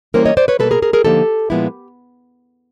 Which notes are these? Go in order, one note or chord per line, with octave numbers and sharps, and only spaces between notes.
E3 G3 A#3 C#4 E4 A#4 C5
C#5 D#5
C5 D5
B4 C#5
B2 G3 A#3 A4 B4
G#4 A#4
G#4 A#4
G#4 A#4
D3 F3 A#3 D#4 G4 A4
A#2 F3 G#3 B3 E4